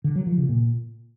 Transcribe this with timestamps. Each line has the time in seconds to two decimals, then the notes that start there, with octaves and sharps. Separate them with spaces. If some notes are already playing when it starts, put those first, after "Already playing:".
0.04 D3
0.16 F#3
0.27 F3
0.38 C#3
0.49 A#2